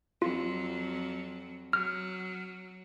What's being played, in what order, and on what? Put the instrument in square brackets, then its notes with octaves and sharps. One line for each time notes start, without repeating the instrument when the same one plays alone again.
[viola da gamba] F2 F#3 [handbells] F4
[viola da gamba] F#3 [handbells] F6